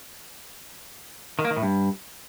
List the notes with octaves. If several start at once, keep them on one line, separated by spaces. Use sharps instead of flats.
D#3
A#3
D#3
A2
G2